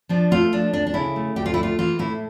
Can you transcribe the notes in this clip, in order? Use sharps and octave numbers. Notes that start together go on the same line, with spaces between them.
F3 D4
A3 F4
F3 D4
D2 D4
D4
C#3 E4
A3
D2 G4
F4
E4
A3
F4
E3 F4
A2 E4